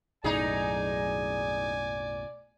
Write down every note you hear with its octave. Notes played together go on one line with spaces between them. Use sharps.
B1 F#2 A2 D#4 G#4 D5 G#5